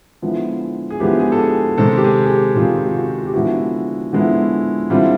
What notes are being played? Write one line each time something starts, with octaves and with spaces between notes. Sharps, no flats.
D3 F3 G#3 B3 E4
G#4
D3 F3 G#3 B3 E4 G4
G#4
A4
G#4
C3 D#3 G#3 C4 A4
G4
G#4
G#4
G4
C3 D#3 G#3 C4 F4
F4
F#4
G4
D3 F3 G#3 B3 E4 F#4
D3 F3 G#3 B3 E4
D3 G3 C4 E4 F4